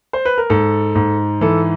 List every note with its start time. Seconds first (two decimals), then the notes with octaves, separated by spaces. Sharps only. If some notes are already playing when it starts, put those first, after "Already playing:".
0.13 C5
0.25 B4
0.38 A#4
0.50 G#2 A4
0.95 G#2
1.41 E3 A4